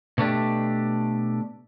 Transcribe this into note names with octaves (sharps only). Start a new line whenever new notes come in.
B2 A3 D4 G4